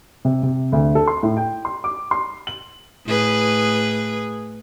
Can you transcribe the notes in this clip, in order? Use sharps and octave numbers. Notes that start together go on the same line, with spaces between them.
C3
C3
D2
A4
C6
A2
G5
C6
D6
C6
F#7
A2 G#4 B4